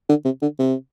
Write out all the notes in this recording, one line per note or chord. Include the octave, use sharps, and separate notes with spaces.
D3
C3
D3
C3